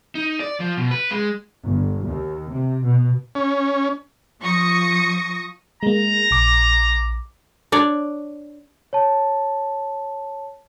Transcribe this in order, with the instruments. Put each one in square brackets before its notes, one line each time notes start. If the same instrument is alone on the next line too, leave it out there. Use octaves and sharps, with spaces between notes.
[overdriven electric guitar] D#4
D5
F3
B2
B4
G#3
[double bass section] G1
D#2
C3
B2
[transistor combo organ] C#4
[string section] F3 C#6 D#6 A#6 C#7
[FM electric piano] G#3 A#3 [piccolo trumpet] A#5
[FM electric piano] A#1 D6
[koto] D4 C#5 D5
[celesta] C#5 A5